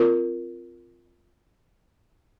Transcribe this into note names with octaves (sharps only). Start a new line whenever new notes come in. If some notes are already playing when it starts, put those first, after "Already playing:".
Already playing: C4 F4 A#4